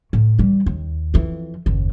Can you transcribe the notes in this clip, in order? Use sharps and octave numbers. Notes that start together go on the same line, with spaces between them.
A2
E3 G3
D#2
F2 E3
F#1 D#2